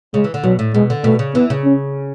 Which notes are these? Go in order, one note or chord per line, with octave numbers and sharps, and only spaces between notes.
C#3 G#3
E3
D3
B2 F#3
A2
B2 G#3
D3
B2 A3
C#3
E3 B3
C#3
C#4